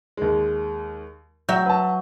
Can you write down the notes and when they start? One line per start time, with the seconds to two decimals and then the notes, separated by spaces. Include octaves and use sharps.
0.17 D#2 G#3
1.49 F#3 E5 G6
1.66 B4 A5